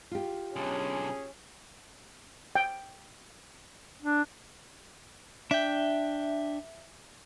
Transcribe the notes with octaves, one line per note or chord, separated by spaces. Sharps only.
F4 G4
B1 D3 C#4 G#4
G5
D4
D4 E5 G5